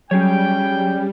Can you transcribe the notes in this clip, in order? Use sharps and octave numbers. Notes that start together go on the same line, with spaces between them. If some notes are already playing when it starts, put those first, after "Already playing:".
F#3 G3 C#4 G#4 C#5 G5